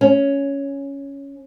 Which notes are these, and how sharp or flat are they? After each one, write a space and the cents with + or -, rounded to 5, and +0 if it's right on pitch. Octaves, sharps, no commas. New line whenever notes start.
C#4 +5